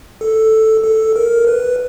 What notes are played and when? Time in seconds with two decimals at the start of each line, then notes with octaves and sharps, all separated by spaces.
0.21 A4
0.84 A4
1.16 A#4
1.47 B4